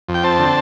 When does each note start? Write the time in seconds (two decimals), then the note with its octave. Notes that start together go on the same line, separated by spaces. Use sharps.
0.08 F2
0.14 G5
0.24 C4 A5
0.39 D3